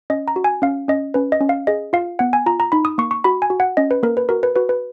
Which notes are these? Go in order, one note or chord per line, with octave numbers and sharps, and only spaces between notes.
C#4 D#5
A#5
F#4
G#5
C#4 F5
C#4 D#5
C#4 B4
D#5
C#4
F5
G#4 D#5
F4 F5
B3 F#5
G#5
F4 A#5
A#5
D#4 B5
D#6
A#3 C#6
C#6
F#4 B5
G#5
F#4
F#5
C#4 D#5
B4
A#3 A#4
B4
F#4 A#4
B4
F#4 B4
B4